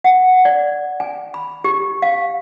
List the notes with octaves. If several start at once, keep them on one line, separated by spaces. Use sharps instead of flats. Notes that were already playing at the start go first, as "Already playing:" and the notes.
F#5
D5
G#5
B5
G4
F5